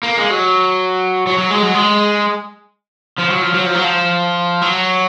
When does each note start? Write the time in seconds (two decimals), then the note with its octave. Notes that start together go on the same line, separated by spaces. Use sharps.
0.03 A#3
0.17 G#3
0.30 F#3
1.27 F#3
1.38 F#3
1.50 G#3
1.63 F#3
1.74 G#3
3.19 F3
3.31 F#3
3.43 F3
3.54 F#3
3.66 F3
3.75 F#3
3.84 F3
4.62 F#3